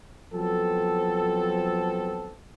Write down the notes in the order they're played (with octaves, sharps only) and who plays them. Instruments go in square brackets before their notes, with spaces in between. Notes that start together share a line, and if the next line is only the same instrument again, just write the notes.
[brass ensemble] F3 F#3 B3 C4 A4